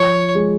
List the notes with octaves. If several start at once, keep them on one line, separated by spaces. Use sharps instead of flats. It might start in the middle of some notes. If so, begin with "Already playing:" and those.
Already playing: F3 C#5
G#3